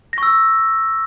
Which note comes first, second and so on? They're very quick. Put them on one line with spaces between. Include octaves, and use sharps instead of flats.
A#6 C#6 E6